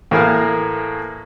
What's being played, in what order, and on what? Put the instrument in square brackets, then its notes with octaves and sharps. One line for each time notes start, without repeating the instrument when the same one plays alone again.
[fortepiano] A2 E3 A#3 G#4 A#4 F5